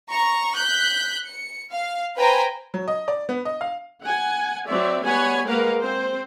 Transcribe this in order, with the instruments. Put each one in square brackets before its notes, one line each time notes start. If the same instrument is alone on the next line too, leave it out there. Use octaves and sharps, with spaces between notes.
[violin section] A#5 C#6
F#6 G6 B6
C#7
F5
B4 C5 G5 G#5 A#5
[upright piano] F#3
D#5
D5
B3
D#5
F5
[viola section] F#5 G#5
F#3 C4 C#5 D5 E5
G3 B3 C#5 F#5 G#5 B5
G#3 A#3 A#4 B4 F5 F#5
C4 C5